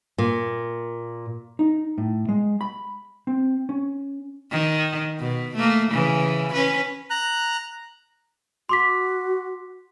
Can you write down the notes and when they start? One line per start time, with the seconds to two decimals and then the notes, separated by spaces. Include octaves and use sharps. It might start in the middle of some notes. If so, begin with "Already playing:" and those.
0.18 A#2
1.59 D#4
1.98 A2
2.29 G#3
2.61 B5
3.27 C4
3.69 C#4
4.51 D#3
5.19 B2
5.55 A3 A#3
5.91 C#3 E3
6.53 C#4 B4
7.10 A#5 F#6
8.69 F#4 C6 D6 B6